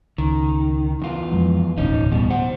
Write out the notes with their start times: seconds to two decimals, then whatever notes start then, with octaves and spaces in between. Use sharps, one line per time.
0.18 C#2 D#3
1.02 E2 F4 B4
1.32 F2 F3 G#3
1.78 E1 D2 A2 C#4 D#4
2.11 E2 B2 G3
2.30 C5 F#5